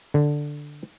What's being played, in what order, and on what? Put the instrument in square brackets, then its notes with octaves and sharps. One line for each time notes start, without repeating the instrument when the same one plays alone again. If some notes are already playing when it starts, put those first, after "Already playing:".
[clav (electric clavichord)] D3